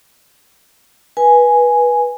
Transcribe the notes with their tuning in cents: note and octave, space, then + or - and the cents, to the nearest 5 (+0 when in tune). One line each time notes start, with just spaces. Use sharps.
B4 -20 G#5 +0